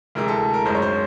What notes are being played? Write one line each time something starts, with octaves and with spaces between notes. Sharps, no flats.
D2 C3 E3 G#3 A#4
A4
A#4
G#1 F#2 D#3 G#3 C5
C#5
C5